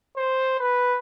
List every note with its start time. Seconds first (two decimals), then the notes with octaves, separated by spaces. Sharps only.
0.16 C5
0.59 B4